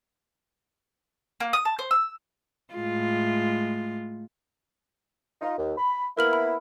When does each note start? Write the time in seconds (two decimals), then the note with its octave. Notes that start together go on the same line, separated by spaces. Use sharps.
1.40 A#3
1.53 D#6
1.65 A5
1.79 C5
1.91 E6
2.74 A2 G#3 F4
5.42 D#4 F4
5.58 D#2
5.78 B5
6.17 A#3 B3 E4 A#4 F6 F#7
6.33 B5